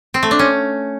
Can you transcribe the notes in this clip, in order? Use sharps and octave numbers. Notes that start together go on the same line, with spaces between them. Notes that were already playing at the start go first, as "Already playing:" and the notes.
C4
A3
D4
C#4